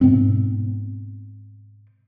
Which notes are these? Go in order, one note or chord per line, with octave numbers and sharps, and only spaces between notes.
G#2 B2 B3 C4